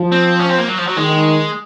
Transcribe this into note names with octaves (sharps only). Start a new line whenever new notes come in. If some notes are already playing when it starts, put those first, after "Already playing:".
Already playing: F3
C4
C#4
C4
A#3
F#3
F3
F#3
D#3 G#3